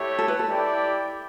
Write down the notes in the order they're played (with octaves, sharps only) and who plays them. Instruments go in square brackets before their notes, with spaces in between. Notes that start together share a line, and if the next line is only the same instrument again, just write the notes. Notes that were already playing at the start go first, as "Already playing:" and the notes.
Already playing: [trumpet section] A3 E4 G4 C#5
[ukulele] A4
B4
A4
[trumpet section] E4 G4 D5 G5